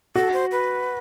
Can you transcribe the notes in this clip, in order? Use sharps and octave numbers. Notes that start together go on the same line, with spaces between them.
F#4 A4
C5
B4